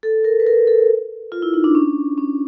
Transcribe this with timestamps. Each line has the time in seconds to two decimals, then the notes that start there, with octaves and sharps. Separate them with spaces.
0.03 A4
0.24 A#4
0.40 B4
0.47 A#4
0.67 A4
1.32 F4
1.42 E4
1.54 D#4
1.64 D4
1.75 C#4
2.18 C#4